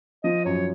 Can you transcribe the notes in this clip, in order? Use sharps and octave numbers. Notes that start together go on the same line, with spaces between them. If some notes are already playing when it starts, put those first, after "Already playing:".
F3 D#5
F#2 C#5